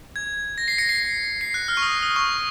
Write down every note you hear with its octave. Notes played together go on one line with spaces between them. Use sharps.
G#6
A#6
C7
A#6 C#7
C7
C7
C7
F#6
F6
C#6
D#6
D#6
C#6